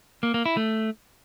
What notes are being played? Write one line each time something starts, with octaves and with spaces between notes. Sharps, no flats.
A#3
A#3
E4
A3